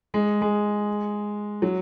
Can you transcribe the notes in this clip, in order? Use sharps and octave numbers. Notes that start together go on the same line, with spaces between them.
G#3
G#3
F#3